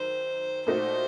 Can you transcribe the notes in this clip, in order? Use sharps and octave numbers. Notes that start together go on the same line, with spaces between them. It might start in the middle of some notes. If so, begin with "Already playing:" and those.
Already playing: F#2 D#3 C5
A#2 A3 D#4 F#4 C5